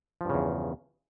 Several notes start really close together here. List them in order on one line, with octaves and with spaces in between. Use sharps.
F3 G2 C#3 E2